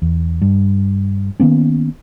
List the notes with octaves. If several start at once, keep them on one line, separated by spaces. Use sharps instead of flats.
E2
G2
D#3 A#3 B3 C#4